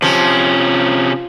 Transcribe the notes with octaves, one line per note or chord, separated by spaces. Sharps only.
C3 F3 C#4